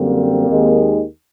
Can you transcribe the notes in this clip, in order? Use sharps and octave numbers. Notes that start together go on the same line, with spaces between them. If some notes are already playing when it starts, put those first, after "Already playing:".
Already playing: F#2 D3 G3 A#3 C4
D#2 D#3 G#3